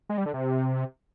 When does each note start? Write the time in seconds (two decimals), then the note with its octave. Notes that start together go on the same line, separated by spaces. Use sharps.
0.09 G#3
0.18 G3
0.26 D3
0.34 C3